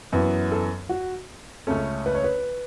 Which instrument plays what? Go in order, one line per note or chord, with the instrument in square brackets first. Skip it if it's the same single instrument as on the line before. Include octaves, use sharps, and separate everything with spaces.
[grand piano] F#2 E3 B3 [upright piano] B4
[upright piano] A4
F#4
[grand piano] C#2 C#3 A3 C#4 [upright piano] A4
[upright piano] B4
C#5
B4